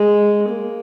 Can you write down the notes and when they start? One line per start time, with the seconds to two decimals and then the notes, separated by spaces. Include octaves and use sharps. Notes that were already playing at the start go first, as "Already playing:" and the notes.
Already playing: G#3
0.49 A#3